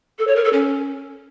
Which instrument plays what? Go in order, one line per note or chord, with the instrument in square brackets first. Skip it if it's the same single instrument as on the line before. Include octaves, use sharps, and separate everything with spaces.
[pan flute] A4
C#5
A#4
A4
C#4